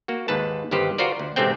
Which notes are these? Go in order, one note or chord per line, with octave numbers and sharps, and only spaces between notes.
A#3 F#4
D#2 G#2 B4 A5
G1 G2 D#3 G4 B4 C5
F4 F#4 A#4 C5 D5
D2
A1 G#2 C3 A3 C4 G5